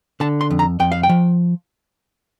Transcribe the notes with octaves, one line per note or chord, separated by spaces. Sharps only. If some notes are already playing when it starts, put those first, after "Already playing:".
D3 A5
C6
F2
A#5
F2 G5
F5
G5
F3